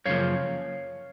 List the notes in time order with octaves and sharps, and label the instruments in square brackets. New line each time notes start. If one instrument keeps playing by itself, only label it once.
[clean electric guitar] F#2 C#3 F3 A#3 C#5 F5